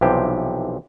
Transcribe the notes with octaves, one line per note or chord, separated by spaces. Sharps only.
B1 C3 E3 F3 G4 C5